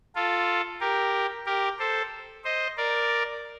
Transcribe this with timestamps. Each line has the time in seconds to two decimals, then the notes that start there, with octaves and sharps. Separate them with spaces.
0.15 F4 A4
0.80 G4 A#4
1.46 G4 A#4
1.79 A4 C5
2.44 C5 D#5
2.77 A#4 D5